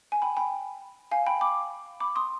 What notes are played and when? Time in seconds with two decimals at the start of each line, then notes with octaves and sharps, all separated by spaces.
0.12 G#5
0.22 G5 B5
0.37 G5 B5
1.11 F5 G#5
1.27 G5 B5
1.41 B5 D6
2.00 B5 D6
2.16 C6 D#6